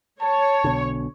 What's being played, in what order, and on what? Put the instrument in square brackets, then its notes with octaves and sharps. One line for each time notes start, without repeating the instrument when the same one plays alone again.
[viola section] C#5 [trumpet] A5
[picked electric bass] B1 B2 D3